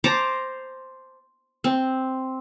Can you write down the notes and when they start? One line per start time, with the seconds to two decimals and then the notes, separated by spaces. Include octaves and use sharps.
0.04 C5 A5 A#5 D6
1.64 C4